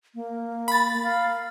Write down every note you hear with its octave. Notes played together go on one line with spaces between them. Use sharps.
A#3
B5 A6
F5